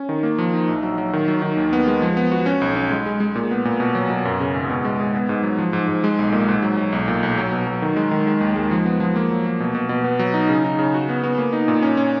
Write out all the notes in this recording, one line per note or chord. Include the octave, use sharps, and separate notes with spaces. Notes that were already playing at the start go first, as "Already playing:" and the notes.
Already playing: C#4
D#3
A#3
F3
D#4
A#1
F#3
F#3
D#3
F#3
D#3
D#2
B3
G#3
F3
B3
F#4
C#4
B1
C#4
G#3
G#3
G#3
A#2
B3
A#2
B2
F#3
B2
F#2
C#3
G#1
B2
G#3
G#4
B3
G#2
F#3
F3
G#2
G#2
G#3
B1
A#2
G#2
F#3
F#3
B1
A#2
B1
F#3
B2
F#3
D#3
G#3
D#3
G#3
D#2
G#3
F3
B3
F3
A#3
F#3
A#3
B2
B2
B2
B3
F#3
D#4
C#3
D#4
C#3
F#4
B3
B3
A#3
D#4
A#2
C#4
C#4